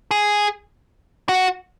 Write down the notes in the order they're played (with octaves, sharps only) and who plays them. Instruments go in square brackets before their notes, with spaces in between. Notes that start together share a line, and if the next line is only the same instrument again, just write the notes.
[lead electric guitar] G#4
F#4